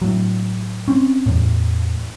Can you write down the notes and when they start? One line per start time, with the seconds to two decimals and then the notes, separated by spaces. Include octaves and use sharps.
0.02 A2 F#3
0.88 C4 C#4
1.26 E2 A2